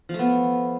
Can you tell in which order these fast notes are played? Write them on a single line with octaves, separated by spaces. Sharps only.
F3 A3 B3